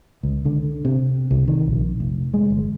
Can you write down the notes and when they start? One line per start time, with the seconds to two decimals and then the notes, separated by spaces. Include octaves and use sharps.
0.23 C#2
0.45 D3
0.85 C3
1.31 C2
1.48 D#3
1.67 A#1
2.00 F1
2.34 G#3
2.50 G1